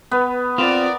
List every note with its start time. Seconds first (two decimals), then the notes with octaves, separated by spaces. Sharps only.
0.11 B3 B4
0.58 C4 F4 A#4 D5